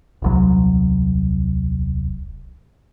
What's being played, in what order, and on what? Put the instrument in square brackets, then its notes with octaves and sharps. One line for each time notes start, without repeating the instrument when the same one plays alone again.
[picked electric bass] D#1 C2 F#3